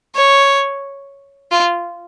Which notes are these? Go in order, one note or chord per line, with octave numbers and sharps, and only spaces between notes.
C#5
F4